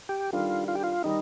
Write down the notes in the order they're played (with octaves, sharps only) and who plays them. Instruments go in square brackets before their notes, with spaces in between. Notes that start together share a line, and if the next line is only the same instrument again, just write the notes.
[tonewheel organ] G4
[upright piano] D#3 G3 D4 A4 [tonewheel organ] F4
[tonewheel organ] F4
G4
F4
[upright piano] D#3 G3 [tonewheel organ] D#4